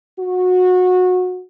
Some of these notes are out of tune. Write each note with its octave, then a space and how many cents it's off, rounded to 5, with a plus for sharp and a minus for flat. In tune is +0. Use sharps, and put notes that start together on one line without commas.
F#4 -20